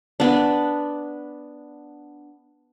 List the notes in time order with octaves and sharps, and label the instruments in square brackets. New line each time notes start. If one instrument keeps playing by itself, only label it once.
[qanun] B3 D4